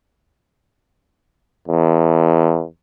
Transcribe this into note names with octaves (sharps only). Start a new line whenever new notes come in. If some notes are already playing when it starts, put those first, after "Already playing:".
E2